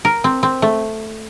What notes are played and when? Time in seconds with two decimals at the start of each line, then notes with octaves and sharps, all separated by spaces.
0.05 A#4
0.24 C4
0.43 C4
0.62 A3